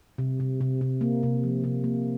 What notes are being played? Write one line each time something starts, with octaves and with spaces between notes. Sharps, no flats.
C3
C3
C3
C3
A#3
C3
F3
C3
A#3